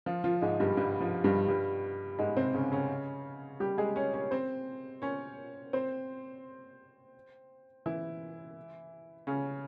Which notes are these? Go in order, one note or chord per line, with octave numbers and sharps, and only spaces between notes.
F3 F4
F3 F4
G#2 G#3
G2 G3
G2 G3
F3
G2 G3
G2 G3
G#2 G#3
C3 C4
C#3 C#4
C#3 C#4
G3 G4
G#3 G#4
C#4 C#5
C#4 C#5
C4 C5
C#4 C#5
C4 C5
E3 E4
C#3 C#4